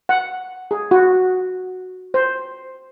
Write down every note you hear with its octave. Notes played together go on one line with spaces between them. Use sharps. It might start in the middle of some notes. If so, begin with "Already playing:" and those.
F#5
G#4
F#4
C5